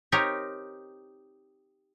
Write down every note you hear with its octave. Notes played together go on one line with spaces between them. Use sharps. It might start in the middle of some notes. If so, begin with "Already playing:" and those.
C4 D#4 G4 A#4 C#5